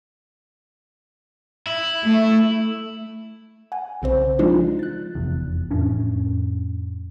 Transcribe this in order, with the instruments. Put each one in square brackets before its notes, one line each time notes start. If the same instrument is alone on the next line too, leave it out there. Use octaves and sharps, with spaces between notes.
[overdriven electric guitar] E4
[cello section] A3
[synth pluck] F#5 G#5
B1 C#3 C4 C5
F3 G#3 D4 D#4 F4
F#6 A6
[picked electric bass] F1 E2
F2 A2 C#4 D4